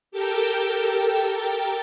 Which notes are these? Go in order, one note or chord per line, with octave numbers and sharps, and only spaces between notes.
G4 A4 A#4 G5 A5